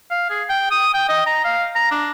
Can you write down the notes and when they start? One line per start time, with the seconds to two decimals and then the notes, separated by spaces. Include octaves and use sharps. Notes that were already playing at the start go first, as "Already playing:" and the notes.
0.11 F5
0.30 G#4
0.49 G5
0.71 D#6
0.94 G5
1.09 D#5
1.26 A#5
1.44 F5
1.75 A#5
1.91 D4